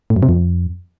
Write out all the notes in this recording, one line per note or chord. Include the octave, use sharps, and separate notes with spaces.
A2
F#2
C3
F2